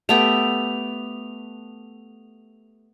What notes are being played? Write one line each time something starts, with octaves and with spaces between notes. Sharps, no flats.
A3 B3 G4 F7